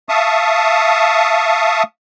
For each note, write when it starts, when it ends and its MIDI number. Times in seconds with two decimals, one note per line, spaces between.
0.09 1.83 76
0.09 1.83 77
0.09 1.83 81
0.09 1.83 85
0.09 1.83 87